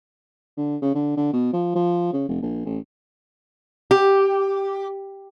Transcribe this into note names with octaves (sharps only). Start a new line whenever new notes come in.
D3
C#3
D3
D3
B2
F3
F3
C#3
F1
A#1
A1
G4